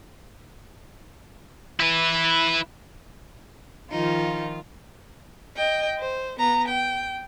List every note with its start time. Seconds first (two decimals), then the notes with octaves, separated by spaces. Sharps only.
1.80 E4 B4
3.91 D#3 F3 D#4 F4
5.56 D#5 G5
5.99 C5
6.39 B3 A#5
6.68 G5